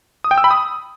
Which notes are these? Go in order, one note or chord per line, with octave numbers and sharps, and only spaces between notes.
D#6
G5
E6
B5
D#6